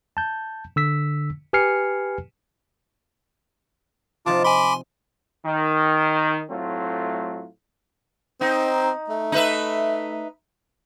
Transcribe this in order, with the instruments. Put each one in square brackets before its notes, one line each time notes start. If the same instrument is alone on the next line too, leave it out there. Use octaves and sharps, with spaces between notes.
[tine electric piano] A5 G6
D3 E6 B6
G4 B4 G#5 F6 C7 C#7
[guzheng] C3 F3 D#4 [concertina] F4 A5 D6
[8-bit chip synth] G#5 C6 [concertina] B5 D6
[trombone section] D#3
A2 F#3 A3 C4 F4
[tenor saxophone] C4 [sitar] D#4
[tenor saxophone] A3
[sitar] D#4 B4 E5